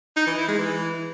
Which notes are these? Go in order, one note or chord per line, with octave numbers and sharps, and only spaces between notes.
D#4
E3
E4
G#3
E3